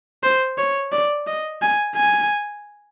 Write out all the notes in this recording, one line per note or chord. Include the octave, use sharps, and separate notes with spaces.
C5
C#5
D5
D#5
G#5
G#5